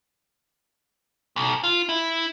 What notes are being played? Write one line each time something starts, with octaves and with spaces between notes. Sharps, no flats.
B1
F4
E4